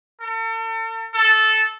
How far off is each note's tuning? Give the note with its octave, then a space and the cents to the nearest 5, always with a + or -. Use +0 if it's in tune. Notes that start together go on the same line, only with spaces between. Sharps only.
A4 +40
A4 -10